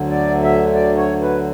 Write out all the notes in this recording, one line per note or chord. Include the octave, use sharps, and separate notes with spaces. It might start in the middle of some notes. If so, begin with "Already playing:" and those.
Already playing: D2 D3 F#3
D5
E5
D5
C#5
B4